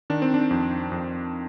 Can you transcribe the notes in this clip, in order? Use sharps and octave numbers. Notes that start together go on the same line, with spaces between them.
D#3 D4
C4
D4
F2
F2